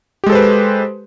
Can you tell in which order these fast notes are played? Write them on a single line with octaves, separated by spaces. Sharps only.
G4 G#3 A4 C5 B4